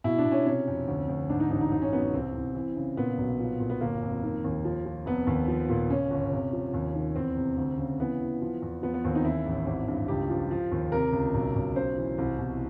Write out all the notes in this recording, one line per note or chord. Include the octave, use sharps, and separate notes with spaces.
B2 E4
D4
B2
C#4
C3 C#4
F2
D2
D2
G#2 D4
D#4
A1 D#4
D#4
F#2 D#4
C#4
F#2 B3
B3
C2 C4
C2
E3
C#3
A#2 B3
B1
F3
A#2
B3
G1 A#3
F2
D#3
D#2
F3
F3
F1 B3
D#2
F3
A#2
C#3 C#4
G1
C3
F3
D#2
D#3
E2 C4
C3
D2
C#3
E3 B3
E3
F3
E2
F3 B3
B3
D#2 C4
D#4
E3 E4
A1
G#1
G2
C#2 G4
F3
F3
D#2
C3 A#4
C#2
B1
B1
C#3 C5
E3
C2
B2